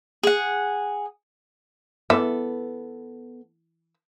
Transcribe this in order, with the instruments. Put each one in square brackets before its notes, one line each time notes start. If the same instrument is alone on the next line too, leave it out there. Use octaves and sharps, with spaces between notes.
[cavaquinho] G#4 F#5
[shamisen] E3 E5 [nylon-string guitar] B3 A4